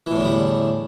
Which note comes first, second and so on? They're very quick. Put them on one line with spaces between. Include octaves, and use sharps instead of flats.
E3 A2 E2 D3 G3